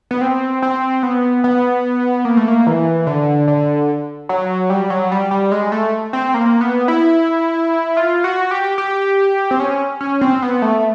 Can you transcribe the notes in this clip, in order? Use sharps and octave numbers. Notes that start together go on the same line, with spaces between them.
B3
C4
C4
B3
B3
A#3
A3
A#3
E3
D3
D3
F#3
G3
F#3
G3
G3
G#3
A3
C4
A#3
B3
E4
F4
F#4
G4
G4
C4
C#4
C#4
C4
B3
A3